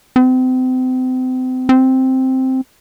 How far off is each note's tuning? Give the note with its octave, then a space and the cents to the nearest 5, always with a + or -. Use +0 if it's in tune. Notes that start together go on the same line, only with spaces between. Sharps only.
C4 -35
C4 +0